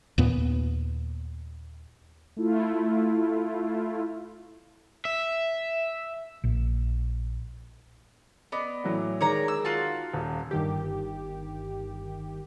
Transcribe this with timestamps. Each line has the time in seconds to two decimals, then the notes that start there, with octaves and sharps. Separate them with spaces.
0.18 D#2 A#2 B3
2.37 A3 E4 F4
5.05 E5
6.44 A#1
8.52 B3 D5 D#5
8.84 A2 E3 F#3
9.21 D#3 G#3 C#5 D5 A#5
9.48 E6
9.65 F4 F#4 A5
10.13 D#1
10.51 G1 D#3 G4